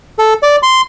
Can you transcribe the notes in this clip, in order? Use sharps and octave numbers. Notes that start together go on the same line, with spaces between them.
A4
D5
C6